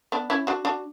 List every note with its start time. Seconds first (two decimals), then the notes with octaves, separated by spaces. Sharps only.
0.12 B3 D4
0.30 C#4 E4
0.47 D4 F#4
0.65 D4 F#4